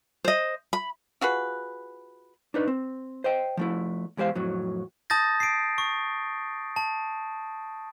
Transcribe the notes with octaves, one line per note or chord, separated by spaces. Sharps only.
C5 D#5
B5
F4 F#4 G#4 B4
D4 D#4 B4
C4
C5 D#5 G5
F3 A3 E4
E2 G#3 G4 C5 F5
F2 A2 F#3
A5 D#6 G6 A6 A#6
C7 D7
C#6
A5